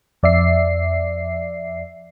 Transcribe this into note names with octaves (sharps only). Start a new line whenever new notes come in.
F2 D5 E5 C7